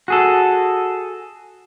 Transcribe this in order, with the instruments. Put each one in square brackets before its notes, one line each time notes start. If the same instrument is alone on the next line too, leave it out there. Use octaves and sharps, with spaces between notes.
[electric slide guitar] F#4 G#4 A4